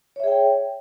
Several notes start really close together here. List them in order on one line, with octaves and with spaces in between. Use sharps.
C#5 E5 G#4 G5